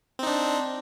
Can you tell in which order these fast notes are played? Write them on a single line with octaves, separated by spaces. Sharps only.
C4 D#4 D4